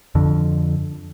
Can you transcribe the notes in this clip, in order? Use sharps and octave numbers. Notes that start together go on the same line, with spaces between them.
F2 D3